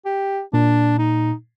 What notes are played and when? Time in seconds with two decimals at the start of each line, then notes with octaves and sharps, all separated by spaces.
0.05 G4
0.53 A#2 D4
0.98 D#4